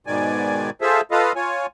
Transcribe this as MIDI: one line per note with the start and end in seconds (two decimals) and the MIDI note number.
0.07 0.70 44
0.07 0.70 47
0.07 0.70 51
0.07 0.70 74
0.07 0.70 80
0.81 1.01 65
0.81 1.01 68
0.81 1.01 69
0.81 1.01 72
0.81 1.01 76
1.11 1.32 65
1.11 1.32 69
1.11 1.32 71
1.11 1.32 75
1.11 1.32 77
1.36 1.66 65
1.36 1.66 73
1.36 1.66 80